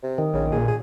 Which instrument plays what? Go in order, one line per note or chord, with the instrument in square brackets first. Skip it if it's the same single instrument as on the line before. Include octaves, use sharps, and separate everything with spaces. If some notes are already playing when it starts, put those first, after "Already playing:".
[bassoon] C3
[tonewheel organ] D#3
[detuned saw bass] A#1 [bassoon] C#3
[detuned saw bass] A#2 [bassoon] G#4
[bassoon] G#4